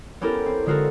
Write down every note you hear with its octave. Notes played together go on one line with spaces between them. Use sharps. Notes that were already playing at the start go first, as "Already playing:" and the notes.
B3 C#4 E4 G4 A4 A#4
C4
D3 G#3 F4 F#4 A4 A#4